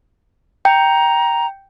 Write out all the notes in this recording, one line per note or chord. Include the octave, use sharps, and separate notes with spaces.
G5 A#5